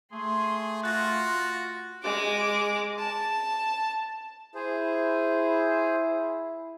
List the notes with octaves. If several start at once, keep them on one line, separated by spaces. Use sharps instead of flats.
A3 G#4 C6
F4 F#4 F#6 A6 A#6
G#3 D6
A5
E4 G#4 C5